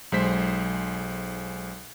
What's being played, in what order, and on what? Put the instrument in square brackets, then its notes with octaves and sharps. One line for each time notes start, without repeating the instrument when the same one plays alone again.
[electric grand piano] B1 G#3 C5 B6